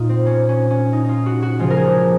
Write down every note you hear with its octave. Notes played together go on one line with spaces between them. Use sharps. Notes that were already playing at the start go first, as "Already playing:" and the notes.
Already playing: A#2 D#4 F4
C4
C#4
C#4
C#4
D#4
D#4 F4
F#4
F#4
C#3 F3 G#3 F4
A#4
G#4